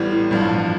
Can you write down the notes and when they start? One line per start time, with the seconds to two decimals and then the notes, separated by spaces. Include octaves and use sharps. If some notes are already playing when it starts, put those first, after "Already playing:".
Already playing: A1 A2 G3 B3
0.31 A1 G2 F3